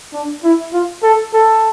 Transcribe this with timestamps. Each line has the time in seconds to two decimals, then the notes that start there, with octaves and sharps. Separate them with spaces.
0.13 D4
0.44 E4
0.73 F4
1.03 A4
1.33 A4